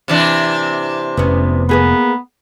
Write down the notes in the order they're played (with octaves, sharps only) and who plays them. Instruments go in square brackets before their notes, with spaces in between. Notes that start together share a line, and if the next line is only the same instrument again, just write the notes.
[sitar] C3 E3 D4
[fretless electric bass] F1 [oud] B3 C#4
[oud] A#3 G#4 B4 [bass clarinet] B3